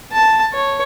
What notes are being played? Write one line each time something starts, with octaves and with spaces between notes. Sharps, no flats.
A5
C#5